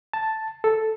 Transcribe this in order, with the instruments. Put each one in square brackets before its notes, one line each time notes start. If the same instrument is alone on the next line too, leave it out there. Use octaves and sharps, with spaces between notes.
[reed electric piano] A5
A4